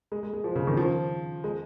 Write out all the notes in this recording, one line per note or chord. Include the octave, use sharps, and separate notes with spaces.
G#3
G#3
G#3
F3
C#3
D#3
F3
G#3